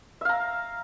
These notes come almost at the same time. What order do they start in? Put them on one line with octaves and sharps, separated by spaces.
E5 F5 A#5